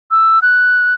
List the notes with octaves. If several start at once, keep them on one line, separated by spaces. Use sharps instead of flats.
E6
F#6